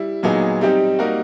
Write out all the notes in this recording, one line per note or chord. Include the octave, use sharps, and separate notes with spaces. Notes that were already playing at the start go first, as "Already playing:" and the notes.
Already playing: G3 E4
A#2 F#3 B3 D#4 G#4
G3 C4 D#4 G4
G3 A#3 D#4 F#4 A#4